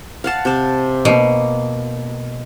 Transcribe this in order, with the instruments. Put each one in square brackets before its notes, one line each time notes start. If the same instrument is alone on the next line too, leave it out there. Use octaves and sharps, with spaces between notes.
[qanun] F5 F#5 A5
C3 A5
[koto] B2 [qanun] A#3